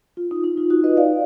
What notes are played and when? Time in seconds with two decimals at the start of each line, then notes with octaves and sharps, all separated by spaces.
0.17 F4
0.31 D#4
0.44 D#4
0.57 F4
0.70 D#4 F#4
0.84 B4 D#5
0.97 D5 F5